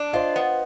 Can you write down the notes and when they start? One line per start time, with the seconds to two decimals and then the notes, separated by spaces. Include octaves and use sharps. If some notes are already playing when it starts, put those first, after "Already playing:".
Already playing: D4
0.13 F4 C5 D#5
0.36 B3